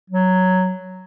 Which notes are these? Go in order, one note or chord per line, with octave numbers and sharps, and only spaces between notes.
F#3